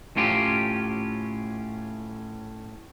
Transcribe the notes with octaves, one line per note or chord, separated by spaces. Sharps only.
A2 C#4 F4 G4